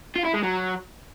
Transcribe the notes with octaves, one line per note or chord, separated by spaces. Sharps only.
F4
E4
G#3
F#3